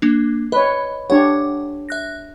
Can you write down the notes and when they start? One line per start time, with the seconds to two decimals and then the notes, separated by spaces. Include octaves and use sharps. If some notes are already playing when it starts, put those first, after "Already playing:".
0.02 A#3 D4
0.52 B4 C#5 D#5
1.10 D4 G4 C#5 F#5
1.89 E5 F#6 A#6